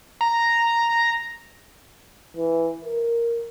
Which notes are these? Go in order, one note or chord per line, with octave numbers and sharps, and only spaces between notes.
A#5
E3
A#4